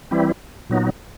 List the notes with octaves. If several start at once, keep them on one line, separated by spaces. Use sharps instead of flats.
E3 G3 C4 E4
A#2 F#3 B3 D#4